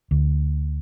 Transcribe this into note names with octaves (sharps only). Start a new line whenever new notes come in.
D2